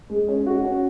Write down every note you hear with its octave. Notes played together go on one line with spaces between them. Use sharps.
G#3
C#4
F#4
C#4